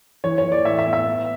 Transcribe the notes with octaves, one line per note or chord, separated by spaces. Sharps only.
E3 C#5
C#5
E3
D5
A2 E5
E5
B3
E5
B3